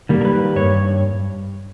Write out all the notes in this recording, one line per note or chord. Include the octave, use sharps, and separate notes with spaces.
D#3 G3 A#3
A#4
B4
G2 C#5